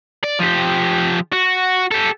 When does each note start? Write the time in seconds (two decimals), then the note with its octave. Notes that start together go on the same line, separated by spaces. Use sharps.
0.24 D5
0.39 F3 G4
1.33 F#4
1.92 G4 A4